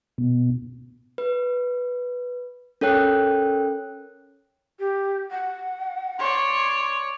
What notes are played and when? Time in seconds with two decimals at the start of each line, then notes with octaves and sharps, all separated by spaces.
0.18 B2
1.18 B4
2.81 C#4 A4 A#4 C#5 G5 F#6
4.79 G4
5.31 F#5
6.19 C#5 D5 C6